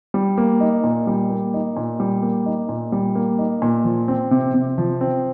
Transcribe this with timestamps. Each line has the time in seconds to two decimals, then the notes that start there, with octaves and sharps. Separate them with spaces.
0.14 G3
0.38 A#3
0.61 D#4
0.84 A#2
1.07 G3
1.30 A#3
1.54 D#4
1.77 A#2
2.00 G3
2.23 A#3
2.46 D#4
2.69 A#2
2.92 G3
3.15 A#3
3.39 D#4
3.62 A#2
3.84 F3
4.08 C4
4.31 C3
4.54 C3
4.78 F3
5.01 C4